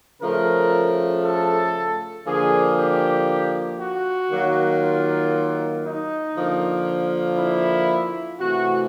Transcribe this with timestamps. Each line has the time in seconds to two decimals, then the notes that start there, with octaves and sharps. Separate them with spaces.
0.21 C#3 F3 A3 A#4
1.24 A4
2.26 D3 F3 A#3 G#4
2.78 G4
3.79 F#4
4.30 D#3 F#3 A#3
4.82 F4
5.84 D#4
6.36 D3 F3 A#3
7.38 E4
8.39 C3 E3 A3 F#4